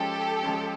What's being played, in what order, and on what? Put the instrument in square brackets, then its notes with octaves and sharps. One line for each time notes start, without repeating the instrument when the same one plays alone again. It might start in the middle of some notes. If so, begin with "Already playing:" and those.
Already playing: [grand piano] F3 G#3 C#4 [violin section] G4 A4
[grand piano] F3 G#3 C#4